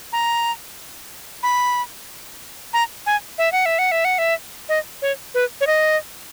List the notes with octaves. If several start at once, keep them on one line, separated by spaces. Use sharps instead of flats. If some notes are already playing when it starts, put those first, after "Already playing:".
A#5
B5
A#5
G#5
E5
F#5
E5
F#5
E5
F#5
E5
D#5
C#5
B4
C#5
D#5